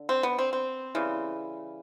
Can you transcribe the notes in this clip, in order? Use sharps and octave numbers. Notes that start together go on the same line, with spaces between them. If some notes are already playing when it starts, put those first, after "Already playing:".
Already playing: D3
C4
B3
C4
C4
C#3 E3 G3